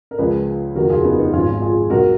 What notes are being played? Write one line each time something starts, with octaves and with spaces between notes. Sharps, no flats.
A#4
C#2 C#3 F3 G#4 B4
F1 D#2 C#3 F3 F#4 A#4
F4 G#4
B3 D#4
B3 D#4
G#1 G#2 F3 C#4 F4
F4 G#4
B1 B2 F#4 A#4